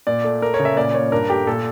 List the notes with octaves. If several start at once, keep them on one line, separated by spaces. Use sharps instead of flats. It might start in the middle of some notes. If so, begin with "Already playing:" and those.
A#2 D5
A3
A3 A#4
C#5
C#3
E5
A#2 D5
A#2 C#5
G2 A#4
A3 G4
A#2 A4